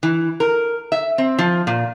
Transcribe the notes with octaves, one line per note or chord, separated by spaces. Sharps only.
E3
A#4
E5
C4
F3
A#2